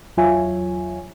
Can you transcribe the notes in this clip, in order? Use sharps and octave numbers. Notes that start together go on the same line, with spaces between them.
E2 F#3 F4 C#5 E5 G#5